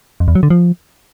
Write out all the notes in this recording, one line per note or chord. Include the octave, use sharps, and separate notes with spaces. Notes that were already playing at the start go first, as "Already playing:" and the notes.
F2
E2
F#3
D3
F3